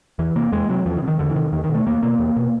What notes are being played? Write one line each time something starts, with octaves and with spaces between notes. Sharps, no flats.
E2 E3
C3 A#3
E2 G#3
C3 F#3
E2 F3
D#3
C3
D#3
E2 D3
E3
C3 D#3
E2 D#3
D#3
B2
A3
E2 A#3
B2 A#3
E2
B2